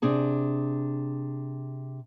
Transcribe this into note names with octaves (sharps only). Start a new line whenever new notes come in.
C3 D4 G#4 A5